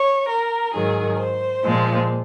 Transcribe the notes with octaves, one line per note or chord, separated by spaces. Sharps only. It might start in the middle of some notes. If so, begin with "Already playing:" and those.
Already playing: C#5
A#4
G#2 D#3 F#3 G#4
C5
A#2 F3 G#3